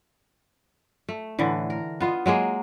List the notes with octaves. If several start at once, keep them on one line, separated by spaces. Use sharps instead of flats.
A3
A2 D3 E3
A#4
B3 F4 D#5
F#3 G#3 A#3 G#4